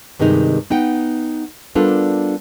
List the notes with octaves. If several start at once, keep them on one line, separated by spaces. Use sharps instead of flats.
G2 C3 D#3 G#3 D#4
B3 D#4 F#5 G5
G3 B3 D4 F4 A4 A#4